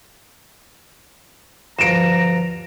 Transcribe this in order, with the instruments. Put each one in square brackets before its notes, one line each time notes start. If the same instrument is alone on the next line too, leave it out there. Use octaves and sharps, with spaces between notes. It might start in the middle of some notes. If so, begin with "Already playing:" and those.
[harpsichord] D2 G2 F3 [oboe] A#5 [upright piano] A#6 D7 E7